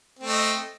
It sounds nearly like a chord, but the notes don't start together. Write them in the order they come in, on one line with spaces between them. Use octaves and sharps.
C4 A3 D#5